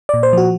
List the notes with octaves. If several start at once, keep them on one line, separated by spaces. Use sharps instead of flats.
A#2 D5
C5
F3 F#4